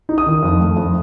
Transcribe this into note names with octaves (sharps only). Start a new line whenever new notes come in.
D#4
D#6
D#3
F2
A3
F2